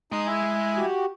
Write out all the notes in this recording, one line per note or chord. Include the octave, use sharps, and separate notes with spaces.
G#3 D#4 C6 D#6
E4 E5 G#5
F#4 G4